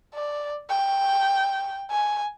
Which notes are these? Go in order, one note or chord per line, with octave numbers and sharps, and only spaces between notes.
D5
G5
G#5